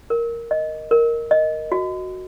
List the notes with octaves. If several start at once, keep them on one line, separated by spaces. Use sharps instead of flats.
A#4
D#5
A#4
D#5
F#4